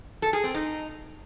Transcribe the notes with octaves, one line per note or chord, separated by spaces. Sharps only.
A4
G#4
C4
D#4